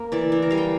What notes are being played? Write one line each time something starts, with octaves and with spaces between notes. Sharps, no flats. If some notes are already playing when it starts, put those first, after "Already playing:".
Already playing: A#3
E3 D5
E3
A#4
G3 F5
G5